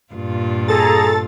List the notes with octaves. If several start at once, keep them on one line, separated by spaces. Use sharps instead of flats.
G2 A#2 F4
G#4 A4 A#5 A6